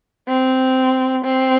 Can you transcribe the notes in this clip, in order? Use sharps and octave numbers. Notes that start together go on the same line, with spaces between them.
C4
C4